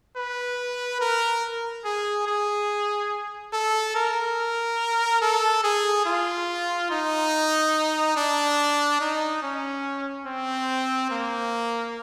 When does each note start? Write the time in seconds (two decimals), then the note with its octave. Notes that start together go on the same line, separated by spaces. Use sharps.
0.17 B4
1.01 A#4
1.85 G#4
2.27 G#4
3.53 A4
3.96 A#4
5.22 A4
5.64 G#4
6.06 F4
6.91 D#4
8.17 D4
9.01 D#4
9.43 C#4
10.27 C4
11.11 A#3